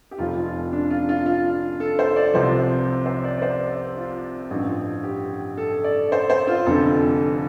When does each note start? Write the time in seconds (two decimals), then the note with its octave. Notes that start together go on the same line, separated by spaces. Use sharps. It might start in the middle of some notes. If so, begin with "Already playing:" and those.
0.11 G4
0.18 F1 F2 F3 F4
0.45 F4
0.73 D4
0.90 F4
1.09 F4
1.26 F4
1.80 A4
1.99 C5
2.16 D5
2.34 C2 C3 F3 C5
3.06 C5
3.24 D5
3.38 D5
3.42 C5
3.96 F4
4.50 A1 G2 F3
5.03 G4
5.57 A4
5.84 D5
6.12 C5
6.30 C5
6.47 F4
6.66 F1 F2 D3 F3 A4